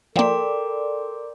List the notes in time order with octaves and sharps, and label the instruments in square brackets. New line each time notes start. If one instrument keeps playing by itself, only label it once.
[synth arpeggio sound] F3 A#3 [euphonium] A4 [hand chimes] A#4 D6 [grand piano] D5 G5 C6